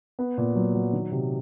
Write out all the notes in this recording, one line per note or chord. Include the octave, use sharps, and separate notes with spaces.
B3
A#2
F#3
F#3
D#3
C3